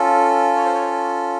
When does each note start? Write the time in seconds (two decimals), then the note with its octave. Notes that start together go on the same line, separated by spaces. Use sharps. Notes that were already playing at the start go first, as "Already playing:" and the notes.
Already playing: C#4 F4 A4
0.56 C#5
0.65 C5
0.74 C#5